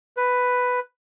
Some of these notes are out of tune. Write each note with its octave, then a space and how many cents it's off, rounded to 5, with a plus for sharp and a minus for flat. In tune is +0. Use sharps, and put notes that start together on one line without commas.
B4 +5